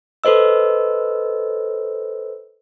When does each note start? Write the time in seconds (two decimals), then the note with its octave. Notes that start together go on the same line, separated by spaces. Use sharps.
0.24 A4 B4 C5 D#5 E6